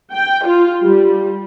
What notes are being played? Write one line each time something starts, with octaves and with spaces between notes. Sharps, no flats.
G5
F4
G3